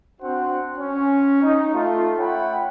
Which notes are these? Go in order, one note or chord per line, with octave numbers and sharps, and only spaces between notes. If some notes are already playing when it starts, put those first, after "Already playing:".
C4 D4 F#4 C5 F#5
C#4
D#4
A3 F4
C#5 E5 F#5 G5 B5